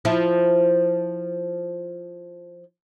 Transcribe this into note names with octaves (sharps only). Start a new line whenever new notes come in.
F3 E4